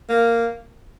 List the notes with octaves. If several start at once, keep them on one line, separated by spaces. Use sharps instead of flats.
A#3